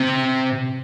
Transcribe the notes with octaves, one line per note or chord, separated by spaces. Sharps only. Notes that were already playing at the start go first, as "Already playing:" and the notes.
Already playing: C3